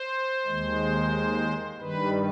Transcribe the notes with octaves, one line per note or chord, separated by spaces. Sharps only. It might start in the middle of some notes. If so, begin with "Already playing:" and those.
Already playing: C5
D#2 D#3 G#3
G2 D#3 G3 B4